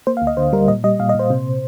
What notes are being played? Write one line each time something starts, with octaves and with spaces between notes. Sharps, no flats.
A#3 C5
F5
D2
D#5
D3 C5
G3 A#4
A#2 D#5
G3 D#5
A#2 F5
D#5
A#2 C5
C3